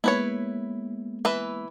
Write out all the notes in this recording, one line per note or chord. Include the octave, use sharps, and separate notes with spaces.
G#3 A#3 B3 E4 B4 C#5
E3 B4 E5